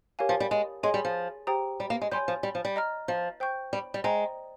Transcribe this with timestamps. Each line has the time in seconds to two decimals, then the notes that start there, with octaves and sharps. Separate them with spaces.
0.19 G4 A#4 C#5 F5 G#5
0.29 F3
0.40 G3
0.51 G#3
0.83 G#3 G#4 C#5 G#5 C6
0.94 G3
1.05 F3
1.47 G4 C5 G5 A#5 D#6
1.80 G3
1.90 A#3
2.01 G#3
2.12 G3 C#5 G#5 C6 G6
2.28 F3
2.43 G3
2.55 F3
2.65 G3
2.76 D#5 A#5 F6
3.08 F3
3.40 C5 G5 C#6 G6
3.73 G3
3.94 G3
4.04 G#3 C5 D#5 G5 A#5